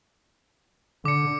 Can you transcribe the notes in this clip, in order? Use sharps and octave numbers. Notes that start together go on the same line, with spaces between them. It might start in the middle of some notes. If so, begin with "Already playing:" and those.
D3 D6 C#7